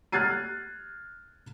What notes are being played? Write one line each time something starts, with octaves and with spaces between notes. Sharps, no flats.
F6 F#6 G#6 A6 C7 D#7